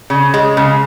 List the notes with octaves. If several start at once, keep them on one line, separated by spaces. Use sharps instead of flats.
C#3
G#3
C#3